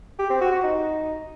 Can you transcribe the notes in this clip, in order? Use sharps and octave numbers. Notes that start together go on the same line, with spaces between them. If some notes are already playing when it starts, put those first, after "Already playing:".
G4
C4
F#4
F#4
D#4